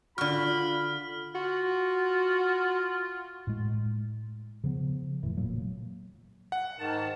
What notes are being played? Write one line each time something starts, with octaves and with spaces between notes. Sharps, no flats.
D3 F4 F#4 B5 F6
F4 F#4
A2 G#3
C#3 F3 B3
F1 A2 E3
A#2 F#3 A#3
F#5
G#2 D#3 A5